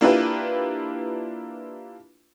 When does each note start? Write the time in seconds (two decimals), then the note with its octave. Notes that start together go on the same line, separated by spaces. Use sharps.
0.01 A#3 D4 E4 F4 G4 B4